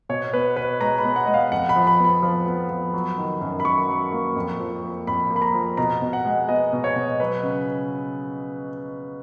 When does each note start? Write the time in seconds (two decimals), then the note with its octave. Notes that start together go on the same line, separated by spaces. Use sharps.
0.09 B2 C#5
0.33 B3 B4
0.56 B2 B4
0.81 G#3 A#5
0.98 B5
1.04 B3
1.16 F#5
1.26 G#3 D#5
1.34 F5
1.52 F2 F#5
1.69 B5
1.76 F3
1.87 B5
1.99 B3
2.04 B5
2.23 F3
2.46 B3
2.70 F3
2.94 F#3
3.18 D#3
3.41 F#2
3.60 B5
3.65 F#3 C#6
3.89 F#3
4.12 A#3
4.36 F2
4.60 F3
4.84 A#3
5.07 F2 B5
5.30 A#3
5.36 B5
5.42 A#5
5.54 F3
5.77 B2 A#5
6.02 B2
6.13 F#5
6.25 G#3
6.49 B3 D#5
6.73 B2
6.84 C#5
6.96 B2
7.20 F#3 B4
7.43 C#3